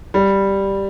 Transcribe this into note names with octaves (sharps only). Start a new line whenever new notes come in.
G3